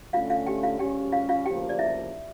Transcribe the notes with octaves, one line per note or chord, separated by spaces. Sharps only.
D3 A3 C#4 F4 F5
F4 F5
G4 G5
F4 F5
D2 C#3 G3 C#4 G4 G5
F4 F5
F4 F5
D2 C#3 F3 A#3 G4 G5
D5
E4 E5